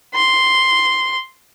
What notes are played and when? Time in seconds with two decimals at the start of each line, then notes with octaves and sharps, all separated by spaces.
0.15 C6